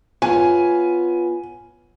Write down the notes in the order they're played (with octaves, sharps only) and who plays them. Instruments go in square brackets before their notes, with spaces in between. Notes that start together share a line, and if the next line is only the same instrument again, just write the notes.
[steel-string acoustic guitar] B3 F4 C#5 [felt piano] G#5